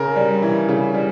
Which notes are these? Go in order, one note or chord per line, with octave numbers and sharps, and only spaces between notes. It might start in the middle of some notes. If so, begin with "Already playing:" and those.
Already playing: C#3 A#4
G3
E3
C#3
G3